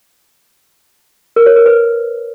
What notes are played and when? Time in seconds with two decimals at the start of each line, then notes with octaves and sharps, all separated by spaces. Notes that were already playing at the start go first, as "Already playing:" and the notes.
1.36 A#4
1.46 C#5
1.56 A#4
1.66 B4